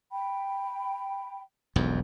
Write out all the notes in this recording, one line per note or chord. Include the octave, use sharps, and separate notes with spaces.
G5 B5
E1 B1 F2